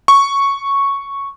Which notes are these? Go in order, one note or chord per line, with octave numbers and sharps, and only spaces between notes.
C#6